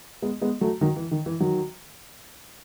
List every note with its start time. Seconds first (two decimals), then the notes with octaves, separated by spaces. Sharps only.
0.22 G#3 B3
0.42 G#3 B3
0.61 F#3 A3
0.81 D#3 F#3
0.96 E3
1.11 D#3
1.26 E3
1.40 D#3 F#3